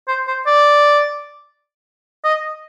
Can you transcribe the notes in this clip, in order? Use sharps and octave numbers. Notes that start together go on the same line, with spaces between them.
C5
C5
D5
D#5